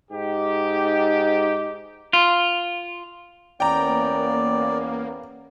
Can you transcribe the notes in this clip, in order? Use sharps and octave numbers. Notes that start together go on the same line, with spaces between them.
G#2 D#4 G4
F4
E2 A#3 B3 C#4 D5 G5 A#5